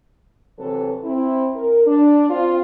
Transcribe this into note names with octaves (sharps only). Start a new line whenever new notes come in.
C3 E3 F#3 A4 B4
C4 E4
A#4
D4
C4 F4